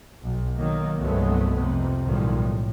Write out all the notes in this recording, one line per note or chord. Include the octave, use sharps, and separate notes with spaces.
B1
D#3 F#3 A#3
C2 G2 F#3 G#3 A3 B3
F2 C3
B1 A2 D#3 F3 G3 G#3
A2